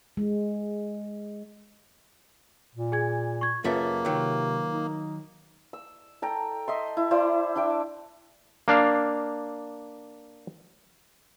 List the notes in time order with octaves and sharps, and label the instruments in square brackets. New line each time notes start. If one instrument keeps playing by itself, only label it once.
[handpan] G#3
[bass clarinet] A#2
[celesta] G#4 G#5 G#6
C#6 G#6
[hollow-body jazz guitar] F#2 C#3 A3 [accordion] A#3 [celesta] F4 B4
[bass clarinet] C3 [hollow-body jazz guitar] D#3 F#3
[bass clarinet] D#4
[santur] E6
A4 G5 A#5
D#5 E5 C6
E4
E4 C5 D5
D4 E4 G5 D6
[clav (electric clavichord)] A#3 D4 F5